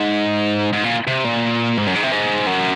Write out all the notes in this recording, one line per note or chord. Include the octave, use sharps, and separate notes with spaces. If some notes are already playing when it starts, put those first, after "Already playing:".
Already playing: G#2
G#2
A#2
C3
A#2
G#2
F#2
G#2
C3
G#2
F#2